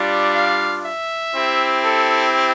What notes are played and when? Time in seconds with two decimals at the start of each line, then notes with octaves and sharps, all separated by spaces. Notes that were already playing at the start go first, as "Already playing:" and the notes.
Already playing: G3 D4 F4
0.33 F5
0.83 E5
1.33 C4 E4 G4
1.83 A4